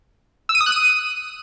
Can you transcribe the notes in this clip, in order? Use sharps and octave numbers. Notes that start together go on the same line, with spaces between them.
E6
D#7
D#6
F#6
D#7